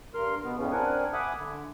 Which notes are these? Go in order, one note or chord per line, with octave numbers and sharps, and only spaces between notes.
G2 A#4 C6 F6
B2 B3
E2 A2 C#3 B3 C#4
C4 D4 A#4 F#5 G#5
E5 F#5 G#5 B5 D6 D#6
D3